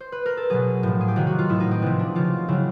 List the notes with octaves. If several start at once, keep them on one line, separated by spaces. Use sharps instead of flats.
C5
B4
A#4
A4
B2 F#3 G#4
A2 F3
G#4
G4
C3 D#3 F#3 F#4
F#4
F4
A2 E3 E4
D#4
C4
C3 F3 B3
D4
C#3 F3 F4
C#3 F#3 E4